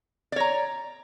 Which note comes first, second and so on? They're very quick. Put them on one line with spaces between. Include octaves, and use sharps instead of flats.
D5 C#5 A#5